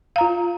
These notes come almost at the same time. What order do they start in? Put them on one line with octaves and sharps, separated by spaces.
F5 A#5 F4